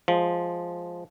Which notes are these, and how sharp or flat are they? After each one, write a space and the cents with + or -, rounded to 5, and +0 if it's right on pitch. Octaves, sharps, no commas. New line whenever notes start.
F3 +0 G#3 +0